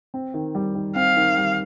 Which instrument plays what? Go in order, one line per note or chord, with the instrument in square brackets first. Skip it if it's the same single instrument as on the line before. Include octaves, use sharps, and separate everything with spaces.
[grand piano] C4
D#3
G3
D#3
[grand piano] C4 [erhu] F5
[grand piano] D#3
G3